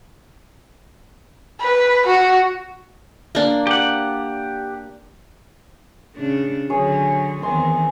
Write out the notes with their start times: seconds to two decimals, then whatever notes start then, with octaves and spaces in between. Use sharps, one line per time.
1.61 B4
2.07 F#4
3.35 A#3 D4
3.67 G4 F#5
6.16 C#3 D4
6.70 D3 F#3 G#4 C#5
7.42 E2 D#3 C4 G#5 C6